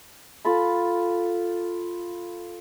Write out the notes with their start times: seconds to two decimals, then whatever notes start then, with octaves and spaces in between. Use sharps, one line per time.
0.45 F4 A4 A5 B5